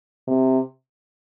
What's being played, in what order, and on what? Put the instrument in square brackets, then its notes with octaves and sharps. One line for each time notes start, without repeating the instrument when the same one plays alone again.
[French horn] C3